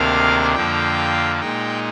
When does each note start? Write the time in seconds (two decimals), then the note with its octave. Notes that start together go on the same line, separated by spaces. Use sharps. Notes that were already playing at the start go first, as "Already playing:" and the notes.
Already playing: D2 C3 D#3 A#3 D4 F5
0.55 F2 D3 F3 A#3 G5
1.40 A#2 G#3 D#4 G5